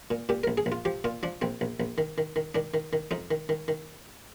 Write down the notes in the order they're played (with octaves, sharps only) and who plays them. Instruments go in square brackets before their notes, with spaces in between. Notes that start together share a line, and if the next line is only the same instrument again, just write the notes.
[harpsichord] A#2
A#2 G4
A#1 A#4
G#4
A#1
F4
F3 G4
A#2 F4
F3 D4
A#1 C4
A#1
A#1
D#3
D#3
D#3
D#3 D4
D#3
D#3
F2 D#4
D#3
D#3
D#3